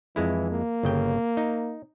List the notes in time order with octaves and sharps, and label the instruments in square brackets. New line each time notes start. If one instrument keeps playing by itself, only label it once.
[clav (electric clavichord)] F2 G#3 E4 [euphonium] E3
[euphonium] A#3
[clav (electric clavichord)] G1 C#3 G5
D#4